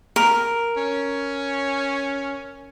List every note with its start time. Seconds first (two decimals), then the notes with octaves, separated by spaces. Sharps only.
0.16 A#4
0.77 C#4